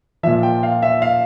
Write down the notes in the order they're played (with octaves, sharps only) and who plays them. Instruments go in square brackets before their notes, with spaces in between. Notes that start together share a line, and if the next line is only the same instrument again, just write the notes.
[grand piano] F3 E5
A#2
G5
F5
E5
F5